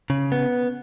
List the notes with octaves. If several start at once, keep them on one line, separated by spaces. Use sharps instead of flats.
C#3
B3